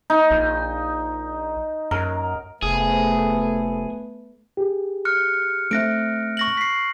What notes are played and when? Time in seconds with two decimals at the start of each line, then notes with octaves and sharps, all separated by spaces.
0.10 D#4
0.31 A#1
1.91 F#2 A#4
2.63 F1 A3 B3 G#4
4.57 G4 G#4
5.05 F6 F#6 C#7
5.71 A3 C4 E5 F#6 A#6 D7
6.37 C#6 A#6 F#7
6.57 B6 C7